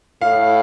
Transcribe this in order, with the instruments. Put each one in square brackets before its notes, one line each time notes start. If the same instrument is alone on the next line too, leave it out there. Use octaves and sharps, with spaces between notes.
[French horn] A2 [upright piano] F5